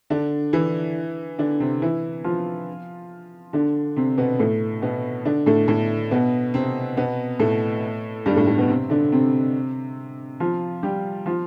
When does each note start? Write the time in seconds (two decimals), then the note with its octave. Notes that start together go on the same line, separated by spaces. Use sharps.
0.10 D3 D4
0.53 E3 E4
1.38 D3 D4
1.60 C3 C4
1.82 E3 E4
2.24 F3 F4
3.53 D3 D4
3.97 C3 C4
4.18 B2 B3
4.39 A2 A3
4.82 B2 B3
5.25 D3 D4
5.46 A2 A3
5.68 A2 A3
6.11 B2 B3
6.54 C3 C4
6.97 B2 B3
7.39 A2 A3
8.26 G2 G3
8.36 A2 A3
8.47 A2 A3
8.57 B2 B3
8.69 C3 C4
8.90 D3 D4
9.12 C3 C4
10.40 F3 F4
10.83 G3 G4
11.26 F3 F4